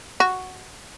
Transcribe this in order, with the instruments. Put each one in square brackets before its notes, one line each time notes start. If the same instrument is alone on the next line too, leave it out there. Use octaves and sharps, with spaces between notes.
[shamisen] F#4